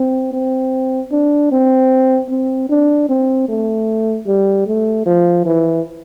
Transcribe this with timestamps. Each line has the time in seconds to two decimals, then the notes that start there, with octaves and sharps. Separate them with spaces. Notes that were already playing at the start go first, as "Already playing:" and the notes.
Already playing: C4
0.33 C4
1.12 D4
1.52 C4
2.30 C4
2.70 D4
3.09 C4
3.49 A3
4.27 G3
4.67 A3
5.06 F3
5.46 E3